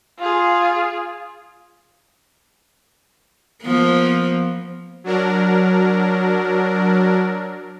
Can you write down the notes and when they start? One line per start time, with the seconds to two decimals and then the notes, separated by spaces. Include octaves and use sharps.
0.18 F4 G#4
3.62 F3 A#3 B3
5.04 F#3 D4 A#4